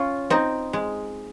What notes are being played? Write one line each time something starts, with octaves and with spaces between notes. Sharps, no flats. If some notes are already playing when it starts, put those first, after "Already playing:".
Already playing: C#4 F4
C4 D#4
G#3